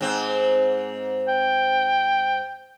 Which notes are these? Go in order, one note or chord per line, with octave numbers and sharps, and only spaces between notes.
G#2 C4
G5